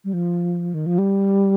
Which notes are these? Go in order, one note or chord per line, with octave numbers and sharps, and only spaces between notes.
G3
F3
D#3
F3
G3